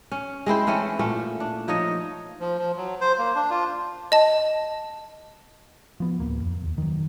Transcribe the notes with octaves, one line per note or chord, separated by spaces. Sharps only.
C#4
G#3 C4 E4 C5
E3 A3 C4 C#4
A#2 A3 C#4
D4
F3 D#4 C#5 D#5
F3
F3
F#3
C5
A#3
D4
F4
D#5 A5
F3 B3
D1 A#3
F2
D#2
D#3 F#3